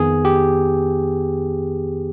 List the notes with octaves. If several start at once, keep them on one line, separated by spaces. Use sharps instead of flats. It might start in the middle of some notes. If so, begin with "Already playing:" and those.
Already playing: F2 D#3 B3 G#4
G4